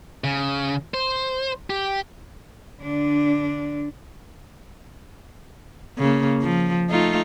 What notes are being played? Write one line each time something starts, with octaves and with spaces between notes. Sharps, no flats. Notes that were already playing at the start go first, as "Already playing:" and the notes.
C#3
C5
G4
D3 D4
C#3 A#3
F3
A3 D#4 F4